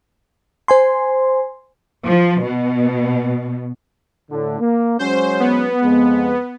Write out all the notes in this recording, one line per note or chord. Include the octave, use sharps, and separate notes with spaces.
C5 G#5 C6
F3
B2
A2 D3
A#3
F#3 G#3 C#4 C5
B3
F2 G#3